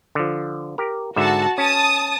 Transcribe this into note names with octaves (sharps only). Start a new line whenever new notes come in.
D3 F3
G4 A#4
G#2 D3 F#4 E5 A5
C#4 A5 D#6